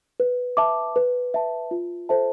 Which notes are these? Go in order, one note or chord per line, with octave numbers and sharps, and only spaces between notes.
B4
E5 A5 D6
B4
E5 A5
F4
A4 C5 E5 A5